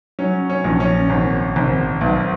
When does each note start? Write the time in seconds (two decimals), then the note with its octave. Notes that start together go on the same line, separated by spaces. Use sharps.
0.19 F#3 C#4
0.50 C#4
0.64 A#1
0.80 C#4
1.10 G#1
1.56 G#1
2.01 B1